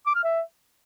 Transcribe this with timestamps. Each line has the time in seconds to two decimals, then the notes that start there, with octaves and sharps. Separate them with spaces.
0.06 D6
0.15 F6
0.24 E5